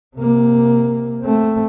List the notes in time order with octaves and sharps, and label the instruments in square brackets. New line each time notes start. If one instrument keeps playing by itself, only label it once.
[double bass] C3 A#3
A3 C4